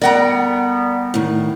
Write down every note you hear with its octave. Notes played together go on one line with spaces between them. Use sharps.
D3 G3 B3 A#4 D5 F#5 G5 A#5
A2 D#3